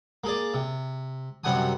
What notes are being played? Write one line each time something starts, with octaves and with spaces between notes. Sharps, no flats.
A#3 G#4 D5
C3
F#2 C3 G3 F#5 G#5 D#6